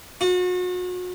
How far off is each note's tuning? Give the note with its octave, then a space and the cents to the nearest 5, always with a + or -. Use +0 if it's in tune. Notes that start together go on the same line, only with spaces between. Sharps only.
F#4 -35